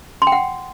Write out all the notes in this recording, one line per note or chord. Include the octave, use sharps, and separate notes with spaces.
C6
G5
F#5